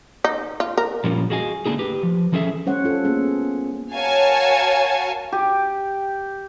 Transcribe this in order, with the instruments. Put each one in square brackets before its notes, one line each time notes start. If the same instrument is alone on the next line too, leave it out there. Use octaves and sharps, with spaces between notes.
[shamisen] D#4
F4
A#4
[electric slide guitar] A#2 F3 G3 C#4 F4
F#4 G#4 D#5 F5 G#5
D3 A3 A#3 D4 D#4 G#4
G4 B4
F3
E3 F3 C#4 G#4 A4 E5
[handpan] G3 A3 C#4 C5 C#5 F#5
F4 A4
A#3 B3 C#4 G#4
[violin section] F#4 A#4 C#5 F5 G#5 A5
[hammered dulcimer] G4